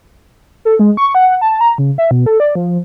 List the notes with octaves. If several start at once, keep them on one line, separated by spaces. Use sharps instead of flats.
A4
G#3
C#6
F#5
A5
A#5
C#3
E5
B2
A4
D5
F3